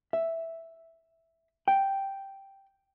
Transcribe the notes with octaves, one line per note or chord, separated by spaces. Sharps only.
E5
G5